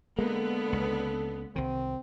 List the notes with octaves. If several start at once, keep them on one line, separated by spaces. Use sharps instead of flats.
D3 G#3 A#3 B3 A4
C#2
C2 D#3 C4